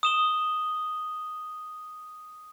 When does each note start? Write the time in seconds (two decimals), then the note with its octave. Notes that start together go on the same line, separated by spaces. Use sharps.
0.03 D#6 E7 G7